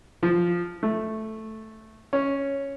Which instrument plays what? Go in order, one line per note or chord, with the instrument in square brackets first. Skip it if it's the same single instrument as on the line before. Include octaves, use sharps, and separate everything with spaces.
[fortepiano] F3
A3
C#4